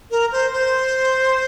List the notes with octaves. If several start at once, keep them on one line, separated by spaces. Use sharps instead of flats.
A#4
C5
C5